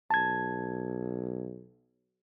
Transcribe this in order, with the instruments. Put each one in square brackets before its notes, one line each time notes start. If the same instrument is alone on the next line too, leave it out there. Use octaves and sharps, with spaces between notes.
[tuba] B1 [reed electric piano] A5 G#6